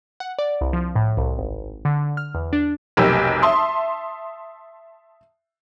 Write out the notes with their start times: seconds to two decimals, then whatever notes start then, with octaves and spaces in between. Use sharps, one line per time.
0.20 F#5
0.39 D5
0.61 C2
0.73 F3
0.96 A2
1.17 C2
1.38 G#1
1.85 D3
2.17 F6
2.35 E2
2.53 D4
2.97 F1 B1 A#3 G4 E6
3.42 E5 A5 C6 D#6